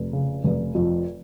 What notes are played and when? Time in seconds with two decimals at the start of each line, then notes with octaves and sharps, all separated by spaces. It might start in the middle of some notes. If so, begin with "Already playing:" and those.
Already playing: F1
0.13 C#3
0.44 F1
0.75 F2